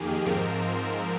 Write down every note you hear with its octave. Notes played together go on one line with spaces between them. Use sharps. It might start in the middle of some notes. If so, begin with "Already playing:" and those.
Already playing: F2 D#3 A#3 G4 G#4
G#2 F3 C4 A#4